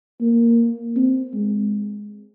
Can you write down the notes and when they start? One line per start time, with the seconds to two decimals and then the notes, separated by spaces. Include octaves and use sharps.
0.21 A#3
0.97 C4
1.34 G#3